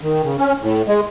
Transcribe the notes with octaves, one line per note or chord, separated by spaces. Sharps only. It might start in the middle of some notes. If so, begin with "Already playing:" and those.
D#3
C#3
C#4
A2
G#3